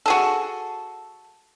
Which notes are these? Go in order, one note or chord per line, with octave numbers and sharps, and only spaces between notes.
F#4 G#4 A4